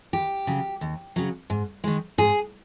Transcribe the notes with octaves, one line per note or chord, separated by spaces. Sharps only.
D#2 G4
C#3 F#3
D#2
C#3 F#3
G#2
D#3 G#3
G#2 G#4